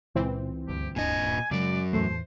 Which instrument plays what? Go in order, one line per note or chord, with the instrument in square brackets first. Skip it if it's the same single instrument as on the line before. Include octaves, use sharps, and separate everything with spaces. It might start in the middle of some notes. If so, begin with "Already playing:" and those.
[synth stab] C#2 E3 C4 [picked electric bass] A#2
[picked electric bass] D2 G2 [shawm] G4
[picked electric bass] D1 G2 D4 [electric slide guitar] A#2 D#5 [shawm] G#5
[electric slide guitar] F#2 F#3 [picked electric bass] C#3 G#3 [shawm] D5
[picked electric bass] E2 A2 E3 [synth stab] A3 [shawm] C5